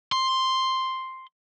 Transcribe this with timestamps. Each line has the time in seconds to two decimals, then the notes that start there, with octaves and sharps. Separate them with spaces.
0.12 C6